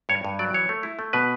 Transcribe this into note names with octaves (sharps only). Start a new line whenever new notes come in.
G2 C#5
G2
F#3 D5
E3 C#5
A3
E4
A3
B2 B4